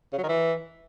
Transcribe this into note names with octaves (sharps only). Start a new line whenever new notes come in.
C#3
F#3
D#3
E3